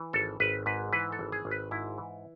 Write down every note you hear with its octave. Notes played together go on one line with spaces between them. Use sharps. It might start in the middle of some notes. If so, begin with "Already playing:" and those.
Already playing: E3
G#1 A4
G#1 B4
G#2 B4
E3 B4
A4
G#1
G#4
G#1
B4
G#2 E4
E3